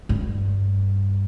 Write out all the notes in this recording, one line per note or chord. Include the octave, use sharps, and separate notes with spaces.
G2